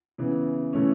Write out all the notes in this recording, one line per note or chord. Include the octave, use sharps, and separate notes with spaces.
C#3 E3 B3
C#3 E3 A3 C#4